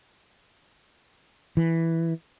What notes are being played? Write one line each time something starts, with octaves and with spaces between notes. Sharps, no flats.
E3